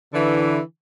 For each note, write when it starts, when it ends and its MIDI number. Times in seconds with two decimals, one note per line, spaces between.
0.14 0.60 50
0.14 0.60 52